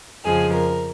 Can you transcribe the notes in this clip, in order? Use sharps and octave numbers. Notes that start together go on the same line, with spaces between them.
F2 C#3 F3 G#3 G#4
A#4